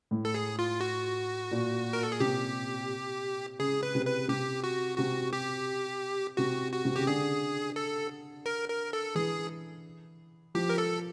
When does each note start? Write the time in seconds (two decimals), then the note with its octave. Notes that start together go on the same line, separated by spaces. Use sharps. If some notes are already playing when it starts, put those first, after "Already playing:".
0.11 A2
0.25 A4
0.34 G#4
0.59 F4
0.81 F#4
1.51 A#2
1.93 A#4
2.03 A4
2.12 G#4
2.20 C3 G4
3.59 C#3 G#4
3.83 B4
3.95 C3
4.05 B4
4.28 C3 G4
4.64 F#4
4.98 C3 F#4
5.33 G4
6.37 C3 F#4
6.73 F#4
6.85 C3
6.96 C#3 G4
7.07 D3 G#4
7.76 A4
8.46 A#4
8.69 A#4
8.93 A4
9.15 E3 G#4
10.55 F3 G4
10.70 A#4
10.78 A4